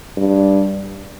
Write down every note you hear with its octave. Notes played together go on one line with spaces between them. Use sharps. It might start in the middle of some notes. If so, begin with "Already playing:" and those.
G2